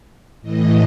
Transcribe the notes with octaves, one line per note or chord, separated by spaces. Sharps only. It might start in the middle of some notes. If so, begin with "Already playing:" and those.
A2 E3 D#5